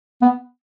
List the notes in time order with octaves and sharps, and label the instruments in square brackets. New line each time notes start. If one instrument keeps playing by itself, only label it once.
[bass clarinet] B3